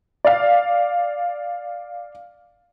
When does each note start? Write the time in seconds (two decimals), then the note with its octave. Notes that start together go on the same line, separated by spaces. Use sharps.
0.25 D5 F5